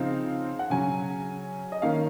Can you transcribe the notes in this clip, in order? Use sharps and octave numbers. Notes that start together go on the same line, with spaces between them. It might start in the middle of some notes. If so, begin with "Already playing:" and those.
Already playing: C#3 F3 C4 D#4 F5
F#5
C#3 F#3 C#4 G#5
D#5
D#3 A#3 C#4 F5